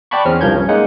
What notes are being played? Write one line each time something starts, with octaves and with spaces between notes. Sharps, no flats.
D5 F#5 G5 A5 B5 C#6
E2 C4 C#4 F6
C2 G2 F3 A#4 G6 G#6
C#4
G#3 A#3 D#4 F#5